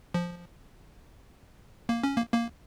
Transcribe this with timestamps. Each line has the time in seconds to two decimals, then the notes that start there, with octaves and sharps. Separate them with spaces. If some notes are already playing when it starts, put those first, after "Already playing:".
0.14 F3
1.89 A#3
2.03 C#4
2.17 A#3
2.34 A#3